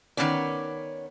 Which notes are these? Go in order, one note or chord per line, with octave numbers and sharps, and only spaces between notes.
D#3 F3 B3 C#4 D5